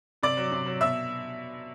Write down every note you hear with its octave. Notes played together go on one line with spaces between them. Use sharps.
C3 D5 D6
F#3
C3
F#3
B2 E5 E6